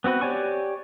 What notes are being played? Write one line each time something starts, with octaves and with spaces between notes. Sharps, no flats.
B3 C4 F#4 B4
G4 C#5 D5 G#5 C#6